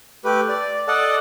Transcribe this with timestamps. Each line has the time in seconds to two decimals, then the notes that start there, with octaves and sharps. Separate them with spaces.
0.24 A3 G4 B4
0.49 D5
0.88 A4 D5 D#5 F#5 A5